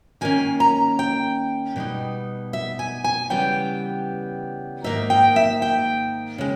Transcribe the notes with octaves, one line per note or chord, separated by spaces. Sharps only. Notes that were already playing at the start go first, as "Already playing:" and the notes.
D#3 A#3 C#4 G#5
A#5
G5
B2 G3 B3 D#4
E5
G#5
G#5
C#3 E3 G3 B3 G5
G#2 D#3 A#3 D#4 E5
G5
E5
G5
C#3 G#3